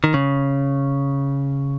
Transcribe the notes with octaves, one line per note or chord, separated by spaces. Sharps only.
D#3
C#3